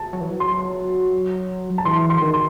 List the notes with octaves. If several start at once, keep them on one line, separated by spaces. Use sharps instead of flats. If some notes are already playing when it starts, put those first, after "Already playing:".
Already playing: A5
F#3
E3
F#3
C6
A5
E3 C6
C6
D#3
C6